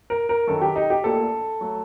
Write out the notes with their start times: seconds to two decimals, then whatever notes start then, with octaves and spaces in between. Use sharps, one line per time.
0.10 A#4
0.29 A#4
0.47 F#2 D#3 F#3 A4
0.62 G4
0.76 D#4
0.90 G4
1.04 A#1 A#2 A3 A4
1.61 F#3 A3